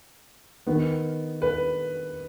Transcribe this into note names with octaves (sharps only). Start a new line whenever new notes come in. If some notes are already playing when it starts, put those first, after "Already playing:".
D#3 B3
B4